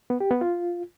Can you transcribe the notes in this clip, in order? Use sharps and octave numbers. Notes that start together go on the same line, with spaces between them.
B3
G4
B3
F4